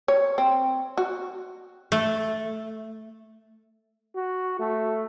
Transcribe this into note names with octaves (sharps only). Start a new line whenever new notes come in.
C#5
C4
F#4
A3
F#4
A3